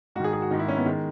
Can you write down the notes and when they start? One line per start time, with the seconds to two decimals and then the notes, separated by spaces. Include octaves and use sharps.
0.16 G#2 F#4
0.20 D#3 G#4
0.33 G#4
0.42 F#4
0.51 G#2 D#3 D#4
0.59 E4
0.68 C#4
0.77 B3
0.86 D#3 G#3